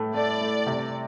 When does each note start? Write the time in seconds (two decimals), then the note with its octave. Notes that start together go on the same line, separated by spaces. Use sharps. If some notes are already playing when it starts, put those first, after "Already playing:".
Already playing: A2 A3
0.14 A3 D5
0.41 A3
0.67 C3